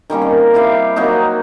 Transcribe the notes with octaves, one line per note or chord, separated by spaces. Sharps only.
D#3 G3 A#3 C#4
C4
E4 G4 E5 F5
F#3 A#3 C4 D#4